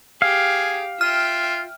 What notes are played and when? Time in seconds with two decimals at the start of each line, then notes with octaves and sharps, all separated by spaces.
0.22 G4 G#4 F5
1.01 F4 E5 G5 F6